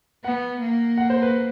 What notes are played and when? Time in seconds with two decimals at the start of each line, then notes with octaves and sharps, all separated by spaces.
0.24 B3 F#5
0.61 A#3
0.97 F#5
1.10 C5
1.22 B4